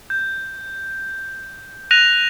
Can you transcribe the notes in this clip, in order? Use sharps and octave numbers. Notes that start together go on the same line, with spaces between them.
G6
F#6 A#6 D#7 F7